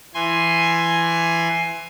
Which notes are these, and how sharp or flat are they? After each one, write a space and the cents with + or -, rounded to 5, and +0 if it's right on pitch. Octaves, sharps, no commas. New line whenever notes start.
E3 +20 G#5 +0 C6 +10